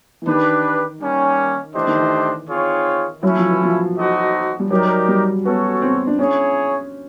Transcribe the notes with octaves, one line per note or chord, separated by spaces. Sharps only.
E3
D#3 D4 G4 B4
G3 A#3 C#4
E3 A3 D4 G4 C5 D#5
D#3
E3
C4 F4 G#4 C#5
F#3 A3 C#4 E4
F3
E3
F3
D#4 F#4 A4 C5 D#5
G3
F#3 D#4 G4 A#4 D5
G3
B3 C#4 F#4 A4 C#5
C4
D4
C#4 E4 G#4 C#5